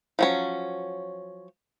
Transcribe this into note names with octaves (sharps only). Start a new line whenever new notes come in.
F3 F#3 C#4